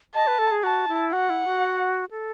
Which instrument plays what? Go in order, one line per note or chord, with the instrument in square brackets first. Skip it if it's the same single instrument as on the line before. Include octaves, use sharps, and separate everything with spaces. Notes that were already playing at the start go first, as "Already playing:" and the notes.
[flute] D#5 [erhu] A5
[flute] B4
A4
G#4
[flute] F#4 [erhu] A5
[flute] E4
[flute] F#4 [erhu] F#5
[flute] E4
F#4
A4